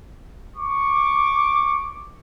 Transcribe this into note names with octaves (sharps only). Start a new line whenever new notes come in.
C#6 D6